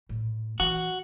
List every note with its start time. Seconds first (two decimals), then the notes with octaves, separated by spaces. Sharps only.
0.09 A2
0.60 E3 F#4